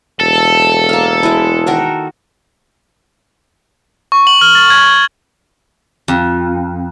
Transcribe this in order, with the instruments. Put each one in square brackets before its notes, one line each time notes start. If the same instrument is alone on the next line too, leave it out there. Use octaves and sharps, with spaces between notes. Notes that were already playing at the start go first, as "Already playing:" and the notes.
[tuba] E1 [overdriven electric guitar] A4
[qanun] A#3 F5
G#3 E4
D#3 F#4 A#4
[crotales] C#6
F#7
F6
A6
G#6
G#6
[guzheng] F2